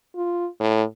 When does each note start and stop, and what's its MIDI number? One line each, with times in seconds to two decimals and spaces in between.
0.16 0.47 65
0.60 0.84 45